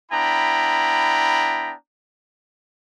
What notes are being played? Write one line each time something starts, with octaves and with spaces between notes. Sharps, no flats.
B3 D4 E4 G5 A#5 B5